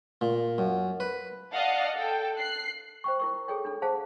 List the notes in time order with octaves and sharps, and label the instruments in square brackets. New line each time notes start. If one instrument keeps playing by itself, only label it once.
[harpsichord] A#2
F#2
B4
[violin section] D5 D#5 F5 F#5 A5
A4 G5
F#6 C7
[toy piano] C5 G5 C#6
E4 A#4 C#6
G#4 A4 C#5 G5
D4 A4
G#4 C5 F5 F#5 A5